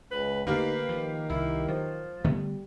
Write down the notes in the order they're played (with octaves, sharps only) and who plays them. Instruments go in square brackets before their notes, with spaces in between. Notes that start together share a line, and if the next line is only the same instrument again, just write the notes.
[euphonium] C#2 [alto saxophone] B4
[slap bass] D3 A3 [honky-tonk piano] A#3 G4 F5 [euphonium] D#4 [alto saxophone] B4
[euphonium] D#3 [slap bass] F3
[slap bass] C2 [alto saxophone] E4
[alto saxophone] F3 [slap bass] F#3
[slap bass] D3 A3 B3 [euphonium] G3